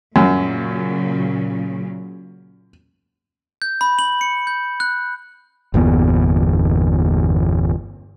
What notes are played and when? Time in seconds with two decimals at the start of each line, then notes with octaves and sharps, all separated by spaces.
0.16 F#2 A#2 C#3 F#3
3.62 G6
3.81 B5
3.99 F#7
4.21 C#7
4.47 G6
4.80 F#6
5.74 G1 E2 A#2 B3